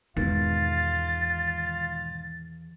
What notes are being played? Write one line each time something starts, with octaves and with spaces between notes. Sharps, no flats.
E2 G#2 B2 D#3 F4 A6